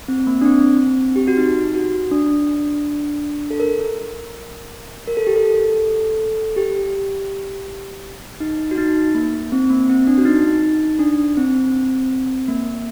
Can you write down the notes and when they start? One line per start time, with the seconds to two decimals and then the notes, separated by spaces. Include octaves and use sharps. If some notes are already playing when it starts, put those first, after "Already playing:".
0.08 C4
0.27 A#3
0.41 D4
0.46 C4
1.16 G4
1.28 F#4
1.37 D#4
1.75 F#4
2.11 D4
3.51 A4
3.60 A#4
5.08 A#4
5.17 A4
5.27 G4
5.36 A4
6.56 G4
8.40 D#4
8.71 F#4
8.78 D#4
9.15 A#3
9.52 C4
9.70 A#3
9.89 C4
10.07 D4
10.18 F#4
10.25 D#4
10.63 D#4
10.99 D4
11.37 C4
12.48 A#3